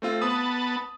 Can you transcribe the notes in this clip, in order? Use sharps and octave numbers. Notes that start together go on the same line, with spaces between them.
A3 C4 F4
B3 A5 D#6